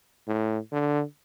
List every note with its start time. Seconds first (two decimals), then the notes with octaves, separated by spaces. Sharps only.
0.28 A2
0.72 D3